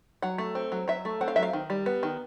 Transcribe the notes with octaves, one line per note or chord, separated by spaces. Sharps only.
F#3 F#5
A3
C4
F#3
F#3 E5
A3
C4 F#5
F5
F#3 E5
F5
D#3
G3
B3
D#3